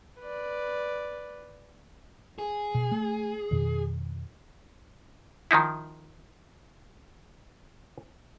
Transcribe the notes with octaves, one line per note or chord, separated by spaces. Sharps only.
B4 D5
G#4
B2
A3
F2 B2 D#3
D#3 F3 D#4 E4